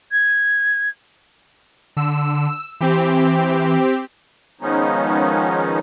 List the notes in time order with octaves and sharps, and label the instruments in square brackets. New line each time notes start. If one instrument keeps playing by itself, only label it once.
[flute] G#6
[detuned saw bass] D3 [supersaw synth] E6
[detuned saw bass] E3 [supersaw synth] C4 G4
[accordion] D#3 F3 G#3 B3 C#4 D#4